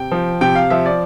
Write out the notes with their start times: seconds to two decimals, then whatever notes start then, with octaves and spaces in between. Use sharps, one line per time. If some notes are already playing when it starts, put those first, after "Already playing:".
Already playing: C3 G5
0.12 F3
0.41 C3 G5
0.55 F5
0.70 F3 E5
0.86 D5